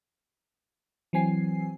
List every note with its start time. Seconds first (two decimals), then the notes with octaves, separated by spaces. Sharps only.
1.13 E3 F#3 C4 G#5 C7